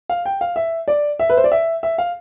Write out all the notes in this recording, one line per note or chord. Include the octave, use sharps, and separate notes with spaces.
F5
G5
F5
E5
D5
E5
B4
C5
D5
E5
E5
F5